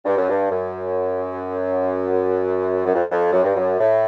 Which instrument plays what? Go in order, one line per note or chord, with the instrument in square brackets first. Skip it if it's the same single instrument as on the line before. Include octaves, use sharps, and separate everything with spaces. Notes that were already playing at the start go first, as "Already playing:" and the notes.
[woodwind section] G2
F#2
G2
F#2
F#2
F2
F2
F#2
G2
F#2
A2